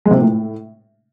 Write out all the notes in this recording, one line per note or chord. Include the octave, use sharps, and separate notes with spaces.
G#3
C3
A#2
A2